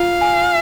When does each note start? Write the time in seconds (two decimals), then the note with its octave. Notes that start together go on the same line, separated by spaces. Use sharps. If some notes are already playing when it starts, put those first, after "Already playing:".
Already playing: F4 F5
0.21 G#5